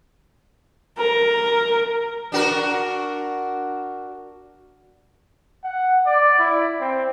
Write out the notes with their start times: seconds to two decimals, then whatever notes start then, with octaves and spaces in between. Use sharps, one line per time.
0.98 A#4
2.32 D4 F#4 A#4
5.64 F#5
6.06 D5
6.39 E4
6.80 C4